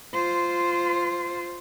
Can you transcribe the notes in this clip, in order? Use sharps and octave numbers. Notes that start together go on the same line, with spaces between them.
F4 C5